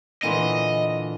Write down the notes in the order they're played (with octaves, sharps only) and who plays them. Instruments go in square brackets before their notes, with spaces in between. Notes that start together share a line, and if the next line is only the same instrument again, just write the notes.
[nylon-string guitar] A#2 D3 E3 [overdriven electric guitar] D#5